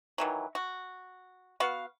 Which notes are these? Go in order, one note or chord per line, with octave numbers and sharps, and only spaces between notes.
D#3 E3 F#3
F#4
B3 F#4 F5